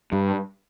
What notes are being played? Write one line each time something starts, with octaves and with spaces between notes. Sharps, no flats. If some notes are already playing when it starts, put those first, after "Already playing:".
G2